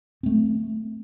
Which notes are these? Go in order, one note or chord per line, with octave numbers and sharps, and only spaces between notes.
A3 C4